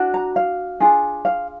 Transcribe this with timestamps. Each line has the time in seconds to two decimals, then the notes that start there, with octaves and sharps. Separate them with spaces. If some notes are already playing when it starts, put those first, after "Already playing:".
Already playing: D4 F#4
0.14 A#5
0.36 F5
0.80 D4 F4 G#4
1.25 F5